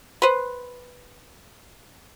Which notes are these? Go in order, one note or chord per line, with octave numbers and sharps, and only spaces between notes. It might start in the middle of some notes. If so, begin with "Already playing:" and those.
B4 C5